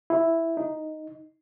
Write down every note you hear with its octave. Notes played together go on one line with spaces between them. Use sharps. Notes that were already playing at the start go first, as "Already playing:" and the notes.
E4
D#4